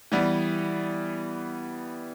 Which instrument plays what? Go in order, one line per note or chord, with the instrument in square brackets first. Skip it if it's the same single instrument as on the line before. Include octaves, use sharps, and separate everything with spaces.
[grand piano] E3 G3 B3